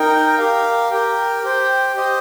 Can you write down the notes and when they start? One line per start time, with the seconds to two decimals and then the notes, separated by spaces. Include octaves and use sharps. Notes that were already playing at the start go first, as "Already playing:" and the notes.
Already playing: D#4 A#4 G5
0.38 G4 A#4 F5
0.91 G4 A#4 G5
1.43 G4 C5 G5
1.96 G4 C5 D#5